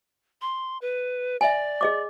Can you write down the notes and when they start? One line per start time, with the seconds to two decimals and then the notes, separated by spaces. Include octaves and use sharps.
0.41 C6
0.82 B4
1.41 D5 E5 G#5
1.81 G#4 D#5 D6